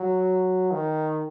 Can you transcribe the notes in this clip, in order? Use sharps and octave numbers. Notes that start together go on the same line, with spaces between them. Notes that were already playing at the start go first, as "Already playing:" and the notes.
Already playing: F#3
D#3